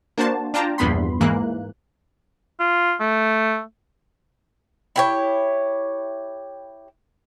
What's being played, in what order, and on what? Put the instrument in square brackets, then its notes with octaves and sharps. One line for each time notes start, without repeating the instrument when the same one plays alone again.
[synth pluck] A#3 D4 F#4 C5 A5
D4 F4 G5 A5 A#5
A#1 E2 G2 B3 B5 C6
G#2 E3 A#3 F#6
[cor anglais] F4
A3
[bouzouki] E4 G4 C#5